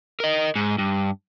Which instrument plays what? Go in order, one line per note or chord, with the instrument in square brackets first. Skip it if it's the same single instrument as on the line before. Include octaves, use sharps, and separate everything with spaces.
[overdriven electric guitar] A#4 D#5
G#2
G2